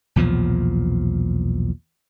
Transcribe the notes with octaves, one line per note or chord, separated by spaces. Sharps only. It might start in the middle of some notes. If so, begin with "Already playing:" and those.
B1 E2 A#2 F3